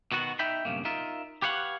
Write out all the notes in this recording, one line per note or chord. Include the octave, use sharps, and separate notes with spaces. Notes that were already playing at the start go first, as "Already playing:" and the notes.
B2 D#3 B3 F#4
D#4 E5 G5 B5
B1 G2 C#3 A#3
D#4 F4 A#4 E5
G4 B4 C#5 F5 F#5